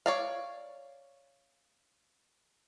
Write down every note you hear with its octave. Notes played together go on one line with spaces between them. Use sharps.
C#5 D5 F5